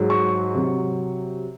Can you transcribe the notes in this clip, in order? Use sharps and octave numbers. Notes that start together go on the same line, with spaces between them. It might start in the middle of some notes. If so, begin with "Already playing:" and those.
Already playing: G#2 F#3
C#6
C3 F#3